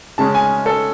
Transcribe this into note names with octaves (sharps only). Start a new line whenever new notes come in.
C#3 G#3 C#4 A5
G#5
A4